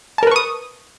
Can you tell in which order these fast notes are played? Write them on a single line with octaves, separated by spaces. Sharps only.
A5 A#4 B4 C#6 D#6